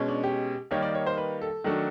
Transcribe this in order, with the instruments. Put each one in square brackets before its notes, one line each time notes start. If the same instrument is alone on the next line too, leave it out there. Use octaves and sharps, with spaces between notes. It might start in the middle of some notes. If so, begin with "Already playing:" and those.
Already playing: [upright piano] B2 G#3 C#4
[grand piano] D4
G4
[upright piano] D#3 G3 A#3 D#4 G4 [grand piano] C#5
[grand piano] D5
C#5
C5
B4
A4
[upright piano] D#3 F#3 A3 D4 F#4